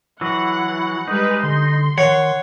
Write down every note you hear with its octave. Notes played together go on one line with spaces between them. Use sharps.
E3 F#3 F#5
G3 G#3 D#4 B4
D3 C6
D#3 C#5 F#5